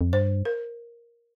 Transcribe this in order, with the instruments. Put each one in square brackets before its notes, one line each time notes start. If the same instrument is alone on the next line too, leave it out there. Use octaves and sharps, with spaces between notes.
[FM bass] F2
[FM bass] G2 [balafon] C5
[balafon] A#4